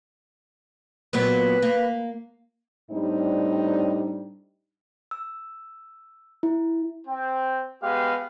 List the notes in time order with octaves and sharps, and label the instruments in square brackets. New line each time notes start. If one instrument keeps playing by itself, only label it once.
[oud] A#2 F#3 B3 [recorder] B4
[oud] A#3
[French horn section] A2 G3 C4 D4 D#4
[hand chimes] E6
E4
[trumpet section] C4 G5
G#3 B3 G4 F5